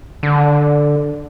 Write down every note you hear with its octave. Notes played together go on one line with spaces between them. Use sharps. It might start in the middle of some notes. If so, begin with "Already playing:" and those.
D3